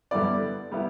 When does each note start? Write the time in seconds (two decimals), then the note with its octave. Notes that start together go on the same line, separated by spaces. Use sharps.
0.11 G2 D3 G3 B3 E4 D5
0.71 D3 G3 B3 E4